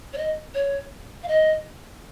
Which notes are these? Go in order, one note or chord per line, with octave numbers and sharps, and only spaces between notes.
C#5
D#5
C#5
F5
D#5